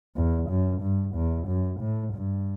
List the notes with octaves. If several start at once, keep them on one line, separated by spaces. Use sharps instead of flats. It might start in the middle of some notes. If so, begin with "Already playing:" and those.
E2
F#2
G2
E2
F#2
A2
G2